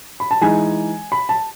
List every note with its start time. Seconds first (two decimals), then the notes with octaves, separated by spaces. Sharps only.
0.20 B5
0.31 A5
0.41 E3 G#3 D#4 G#5
1.12 B5
1.29 A5